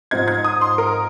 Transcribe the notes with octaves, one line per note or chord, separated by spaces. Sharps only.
G#2 F3 C4 D#4 G#6
G#6
D#6
C6
A#4